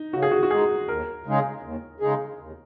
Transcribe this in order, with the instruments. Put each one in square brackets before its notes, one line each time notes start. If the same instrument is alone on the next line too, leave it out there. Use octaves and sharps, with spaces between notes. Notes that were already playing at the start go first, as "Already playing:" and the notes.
Already playing: [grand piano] D#4
[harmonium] C#3 [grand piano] F#4
[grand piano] G#4
F#4
F#4
[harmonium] G#3 D#4 [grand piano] G#4
[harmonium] D#2 [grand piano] A#4
[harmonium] C#3 G#3 D#4 G#4
D#2
C#3 G#3 D#4 G#4
D#2